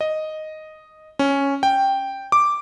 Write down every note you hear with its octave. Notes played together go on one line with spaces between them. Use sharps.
D#5
C#4
G5
D6